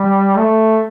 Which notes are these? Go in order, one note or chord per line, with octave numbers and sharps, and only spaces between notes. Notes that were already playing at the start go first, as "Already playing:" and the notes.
Already playing: G3
A3